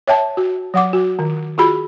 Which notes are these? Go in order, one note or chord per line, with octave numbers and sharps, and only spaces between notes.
C#5 E5 G5 A5
F#4
F#3 F#5 D6
F#4
D#3
F4 F#4 G#4 B5